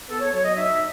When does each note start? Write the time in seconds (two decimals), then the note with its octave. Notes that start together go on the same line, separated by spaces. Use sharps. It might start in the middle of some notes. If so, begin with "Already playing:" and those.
0.09 B3 A4
0.21 C#5
0.33 F#3 C#5
0.44 D#5
0.56 D#4 E5